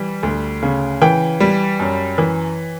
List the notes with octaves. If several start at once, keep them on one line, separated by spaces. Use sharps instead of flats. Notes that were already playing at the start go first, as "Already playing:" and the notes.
Already playing: E3 G3
D2
C#3
E3 G5
G3
F#2
E3